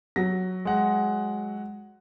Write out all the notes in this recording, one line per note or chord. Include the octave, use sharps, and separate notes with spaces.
F#3 A#6
G#3 F#5